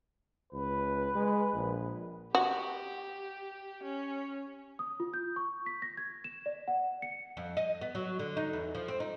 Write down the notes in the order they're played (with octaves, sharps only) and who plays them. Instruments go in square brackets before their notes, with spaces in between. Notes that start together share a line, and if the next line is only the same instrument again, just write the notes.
[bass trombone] C#2 [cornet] B4
[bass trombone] G#3
A#1
[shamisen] F#4 [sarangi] G4
[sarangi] C#4
[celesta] D#6
F4
G6
C#6
B6
A#6
G#6
E7
D5
F#5
C#7
[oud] F2
D#5
B3
F#3
D3
D#4
E2
F3
C4
D#4